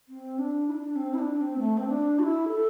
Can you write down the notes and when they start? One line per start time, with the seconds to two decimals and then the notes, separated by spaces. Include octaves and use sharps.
0.09 C4
0.39 D4
0.68 E4
0.72 D4
0.91 D4
0.96 C4
1.14 E4
1.19 D4
1.36 D4
1.41 C4
1.58 A3
1.78 C4
1.88 D4
2.19 F#4
2.23 E4
2.49 A4